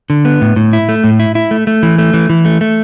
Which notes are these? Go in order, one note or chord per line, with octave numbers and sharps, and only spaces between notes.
D3
B3
A2
A2
E4
A3
A2
E4
E4
A3
A3
E3
A3
E3
E3
A3
A3